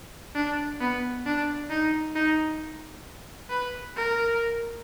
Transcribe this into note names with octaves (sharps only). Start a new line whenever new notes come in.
D4
B3
D4
D#4
D#4
B4
A#4